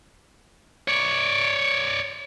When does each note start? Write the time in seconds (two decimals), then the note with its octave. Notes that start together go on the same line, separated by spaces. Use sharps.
0.88 C#5 D5